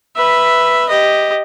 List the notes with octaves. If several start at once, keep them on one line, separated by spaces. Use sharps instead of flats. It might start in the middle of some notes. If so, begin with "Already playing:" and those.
B4 E5
G4 D#5